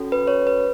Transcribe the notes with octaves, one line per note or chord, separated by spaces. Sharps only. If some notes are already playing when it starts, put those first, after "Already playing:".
Already playing: C#4 F#4 A4
B4
C#5
B4